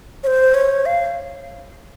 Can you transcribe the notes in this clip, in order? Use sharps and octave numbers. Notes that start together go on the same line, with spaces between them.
C#5
C5
C#5
F5